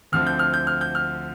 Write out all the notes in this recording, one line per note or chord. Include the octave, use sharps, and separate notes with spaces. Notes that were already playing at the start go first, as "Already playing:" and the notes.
D2 D3 F3 C4 F6
G6
F6
G6
F6
G6
F6